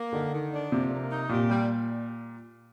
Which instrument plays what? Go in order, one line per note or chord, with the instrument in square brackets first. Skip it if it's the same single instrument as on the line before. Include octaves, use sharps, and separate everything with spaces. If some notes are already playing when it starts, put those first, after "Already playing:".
Already playing: [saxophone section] A#3
[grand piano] D3 [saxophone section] D#3
[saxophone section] D#3
D4
[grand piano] C3 [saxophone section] F3
[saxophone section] A#3
D#4
[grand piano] A#2 [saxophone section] G4
[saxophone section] G3